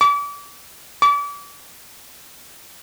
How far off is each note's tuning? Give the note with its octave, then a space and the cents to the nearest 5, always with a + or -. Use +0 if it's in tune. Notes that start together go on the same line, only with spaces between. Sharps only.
D6 -35
D6 -35